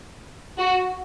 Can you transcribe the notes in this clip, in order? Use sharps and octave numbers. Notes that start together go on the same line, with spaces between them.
F#4